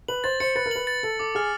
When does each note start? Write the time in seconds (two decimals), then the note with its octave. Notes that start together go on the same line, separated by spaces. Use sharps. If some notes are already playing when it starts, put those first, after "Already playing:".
0.08 B4 F#7
0.24 C5 A6
0.40 C5 C#7
0.56 B4 A6
0.66 A#4
0.71 B4 F#7
0.87 A6
1.03 A4 A6
1.19 A4 D6
1.35 G#4 F6